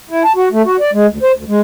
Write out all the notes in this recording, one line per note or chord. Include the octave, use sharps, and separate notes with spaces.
E4
A5
F#4
A3
F#4
D5
G#3
D2
C5
D2
G#3